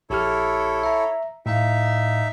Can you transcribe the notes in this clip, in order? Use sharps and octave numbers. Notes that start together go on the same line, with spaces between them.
A#1 E4 G4 A4 C#5 F6
E5 A#5
A2 D#4 E5 F5